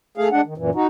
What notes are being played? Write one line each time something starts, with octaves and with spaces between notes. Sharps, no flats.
A3 G#4 F5
G#3 D4 F#5
D#3
F#2 A#2 E3
D#4 F#4